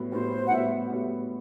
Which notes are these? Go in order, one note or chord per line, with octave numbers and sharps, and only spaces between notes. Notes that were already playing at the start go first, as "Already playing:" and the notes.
Already playing: A2 G3 B3 F#4
A2 G3 B3 F#4 C5
F#5
A2 G3 B3 F#4 E5
A2 G3 B3 F#4